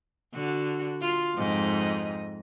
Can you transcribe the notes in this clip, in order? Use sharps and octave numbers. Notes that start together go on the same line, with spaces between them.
D3 F#4
F4
F2 G#2 D#5